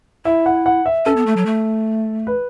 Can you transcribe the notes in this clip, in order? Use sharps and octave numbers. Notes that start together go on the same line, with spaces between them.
E4 E5
F#5
F#5
E5
C#4 A4
B3
A3
F#3
A3
B4